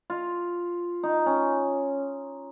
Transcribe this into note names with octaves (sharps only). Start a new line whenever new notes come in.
F4
D#4
C#4